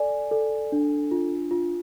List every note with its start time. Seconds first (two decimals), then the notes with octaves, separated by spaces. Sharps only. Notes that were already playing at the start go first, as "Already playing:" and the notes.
Already playing: A4 D5 G#5
0.31 A4
0.72 D4
1.11 F4
1.51 F4